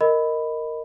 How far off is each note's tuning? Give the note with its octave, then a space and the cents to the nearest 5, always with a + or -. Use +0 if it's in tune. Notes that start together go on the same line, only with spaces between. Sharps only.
A#4 -5 D#5 +0 B5 +10